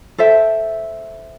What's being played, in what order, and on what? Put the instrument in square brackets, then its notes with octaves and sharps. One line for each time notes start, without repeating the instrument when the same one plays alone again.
[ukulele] A4 C5 E5 G5